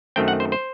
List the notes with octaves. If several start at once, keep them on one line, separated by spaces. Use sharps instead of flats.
F#2 D#3 A3 C4 G5
F#5
C5
C5